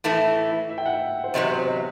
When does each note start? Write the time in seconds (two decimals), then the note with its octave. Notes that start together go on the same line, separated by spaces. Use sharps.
0.04 A2 E3 A3 E4 E5
0.69 E5
0.78 G5
0.86 F#5
0.93 E5
1.24 C5
1.34 E2 C3 F#3 B3 D#5
1.50 C5
1.67 D#5